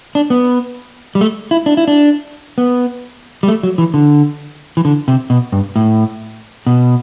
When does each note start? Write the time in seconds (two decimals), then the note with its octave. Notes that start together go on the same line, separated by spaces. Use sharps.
0.15 D4
0.30 B3
1.15 G3
1.21 A3
1.51 E4
1.66 D4
1.77 E4
1.88 D4
2.58 B3
3.43 G3
3.48 A3
3.63 F#3
3.78 E3
3.94 D3
4.77 E3
4.85 D3
5.08 C3
5.30 B2
5.52 G2
5.76 A2
6.67 B2